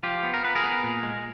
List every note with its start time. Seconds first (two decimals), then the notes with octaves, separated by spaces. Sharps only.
0.03 F3 F4 G4
0.23 B3
0.34 A#4
0.43 B3 B4
0.55 G#4 A#4
0.63 B3
0.83 A#2
1.03 G#3